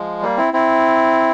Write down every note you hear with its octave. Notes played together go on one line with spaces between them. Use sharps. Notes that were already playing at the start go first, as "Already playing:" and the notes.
Already playing: F3 G#3
G3 A#3
C4 E4
C4 E4